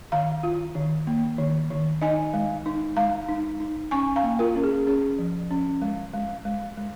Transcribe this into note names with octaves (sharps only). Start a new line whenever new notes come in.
D#3 F5 A#5
F4
D#3
A#3
D#3
D#3
D#4 D#5 G#5
G#3
D#4
G#3 F5 A#5
D#4
D#4
C#4 G#5 C#6
F5 A#5
A#3
F4 A#4
C#4
G#4
C#4 G#4
F3
C#4
G#3
G#3
G#3
G#3